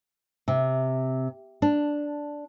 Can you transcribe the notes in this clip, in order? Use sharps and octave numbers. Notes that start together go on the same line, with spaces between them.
C3
D4